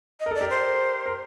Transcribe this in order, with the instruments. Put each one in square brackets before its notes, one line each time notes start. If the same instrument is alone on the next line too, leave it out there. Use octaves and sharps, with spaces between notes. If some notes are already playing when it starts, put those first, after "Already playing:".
[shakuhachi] D#5
[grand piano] A#4
[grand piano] A4 [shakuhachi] D5
[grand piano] G4 A#4
[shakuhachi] C5
[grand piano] A#4